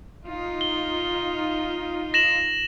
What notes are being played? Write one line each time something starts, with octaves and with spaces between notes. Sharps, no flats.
D#4 F4
G7
A#6 E7 F#7